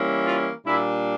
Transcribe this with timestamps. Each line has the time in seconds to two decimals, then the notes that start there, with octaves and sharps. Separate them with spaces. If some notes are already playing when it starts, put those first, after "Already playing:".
Already playing: E3 G3 A#3 C#4 E4
0.25 F4
0.66 A#2 G3 A#3 D4 E4